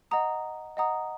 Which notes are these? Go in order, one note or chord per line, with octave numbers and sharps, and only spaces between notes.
D#5 F#5 A#5 D#6
D#5 F#5 A#5 D#6